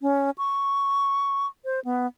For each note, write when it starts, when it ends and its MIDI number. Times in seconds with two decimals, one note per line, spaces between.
0.01 0.31 61
0.38 1.47 85
1.65 1.80 72
1.85 2.07 59